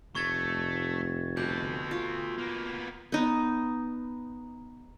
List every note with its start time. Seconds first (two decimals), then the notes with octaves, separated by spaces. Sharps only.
0.15 F1 A3 C#6 G#6 A6
1.37 B2 A3 D5 G6
1.91 F4
2.38 A#3 B3
3.12 B3 D#4